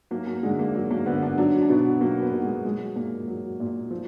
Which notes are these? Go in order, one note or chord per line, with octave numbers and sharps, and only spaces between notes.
F#3 A#3
A#3
D3 G#3
A#3
F#3
A#3
D3 B3
D4
F#3 D4
D4
B2 B3
F#3 A#3
B3
B2
G#3
F#3 G#3
A#2 A#3
F#3
A#2
F3